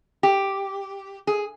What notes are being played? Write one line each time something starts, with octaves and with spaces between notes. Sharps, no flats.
G4
G#4